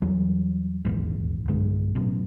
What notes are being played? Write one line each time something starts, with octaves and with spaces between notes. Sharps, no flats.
E2 E3 F#3 G3
D#1 A#1 E2 G#2
B1 G2 D3 G#3
A1 F#2 B2